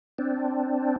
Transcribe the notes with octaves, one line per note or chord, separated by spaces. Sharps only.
C4 D4